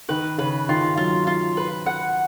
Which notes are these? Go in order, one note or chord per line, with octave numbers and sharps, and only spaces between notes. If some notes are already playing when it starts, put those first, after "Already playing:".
D#3 B4
C#3 B4
D#3 F4
F#3 F4
F4
B4
F#5